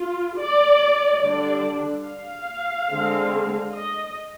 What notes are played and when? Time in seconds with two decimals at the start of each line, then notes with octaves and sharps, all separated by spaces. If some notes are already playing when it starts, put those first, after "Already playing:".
Already playing: F4
0.37 D5
1.21 D3 G3 D4 D5
2.05 F5
2.89 D3 G#3 C4
3.72 D#5